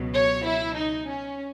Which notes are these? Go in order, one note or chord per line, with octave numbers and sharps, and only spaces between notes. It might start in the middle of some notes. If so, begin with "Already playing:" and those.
Already playing: C#2 B2 F#3
C#5
E4
D#4
C#4